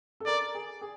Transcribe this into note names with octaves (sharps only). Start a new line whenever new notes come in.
A4
A#4 D5
G#4
G#4